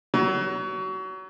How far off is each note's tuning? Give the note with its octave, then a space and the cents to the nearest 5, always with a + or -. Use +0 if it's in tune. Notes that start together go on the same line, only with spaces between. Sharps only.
F#3 +25